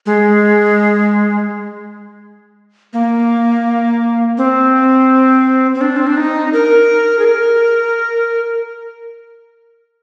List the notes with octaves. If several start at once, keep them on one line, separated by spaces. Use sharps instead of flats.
G#3
A#3
C4
C4
D4
C4
D4
D#4
A#4
G#4
A#4